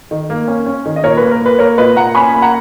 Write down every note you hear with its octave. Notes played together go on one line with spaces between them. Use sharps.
D#3
A#3
C#4
C#4
D#3
D#5
A#2 A#4 C#5
A#3 B4
A#4
A#3 B4
A#3 A#4 C#5
A#2 B4 D#5
A#2 F#5 A#5
C#4 G#5 B5
A#3
F#5 A#5